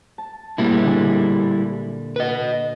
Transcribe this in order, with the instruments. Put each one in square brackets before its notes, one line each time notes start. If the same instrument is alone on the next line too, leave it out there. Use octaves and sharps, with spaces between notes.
[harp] A5
[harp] A#2 [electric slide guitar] G3 G#3 E4
[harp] D3 G#5
[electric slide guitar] B4 D#5